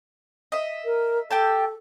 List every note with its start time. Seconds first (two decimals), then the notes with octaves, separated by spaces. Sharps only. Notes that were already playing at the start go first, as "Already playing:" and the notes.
0.52 D#5 E5
0.85 A#4
1.31 G4 A4 G5 A5